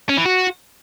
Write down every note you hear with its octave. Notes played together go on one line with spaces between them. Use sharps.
C#4
E3
F#4